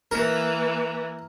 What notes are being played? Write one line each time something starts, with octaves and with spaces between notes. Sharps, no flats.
E3 A#3 A#4